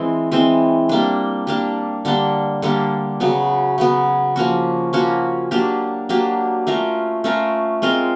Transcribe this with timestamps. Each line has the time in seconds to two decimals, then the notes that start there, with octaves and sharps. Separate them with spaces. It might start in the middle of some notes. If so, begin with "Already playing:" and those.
Already playing: E3 G#3 C4 E4
0.32 E3 G#3 C4 E4
0.89 G3 A#3 D4
1.47 G3 A#3 D4
2.05 D3 G3 A#3 D4
2.62 D3 G3 A#3 D4
3.20 C#3 F#3 B3
3.78 C#3 F#3 B3
4.36 F3 A#3 C#4 F#4
4.93 F3 A#3 C#4 F#4
5.51 F#3 A#3 D4 G4
6.09 F#3 A#3 D4 G4
6.67 A3 C#4 F4 A#4
7.24 A3 C#4 F4 A#4
7.82 G#3 C4 F4 A#4